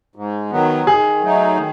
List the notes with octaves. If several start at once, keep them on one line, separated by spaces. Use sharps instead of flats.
G#2
D#3 F#3 B3
D#3 G#4
F#3 A3 D#4
D#3